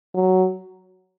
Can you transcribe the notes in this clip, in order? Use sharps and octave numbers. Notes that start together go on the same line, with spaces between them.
F#3